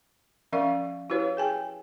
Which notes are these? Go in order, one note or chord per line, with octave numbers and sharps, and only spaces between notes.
F3 C#4 A#4 D5 F5 C#6
E4 F#4 G4 B4 C#5 F5
G#4 G5 G#5